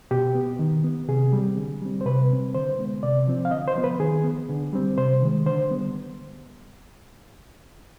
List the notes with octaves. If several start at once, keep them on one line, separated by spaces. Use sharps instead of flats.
B2 G4
B3
D#3
B3
C3 G#4
G3 C4
D3
G3 C4
C5
C3 B4
G3 C4
D3 C5
G#3 B3
C3 D5
F3 C4
F5
D3 D#5
C5
F3 B3
B4
D#3 G#4
B3
D3
G3 C4
C3 C5
D#3 G#3
D3 C5
G3 B3